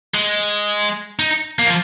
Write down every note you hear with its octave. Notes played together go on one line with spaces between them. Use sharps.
G#3
D#4
A#3
F3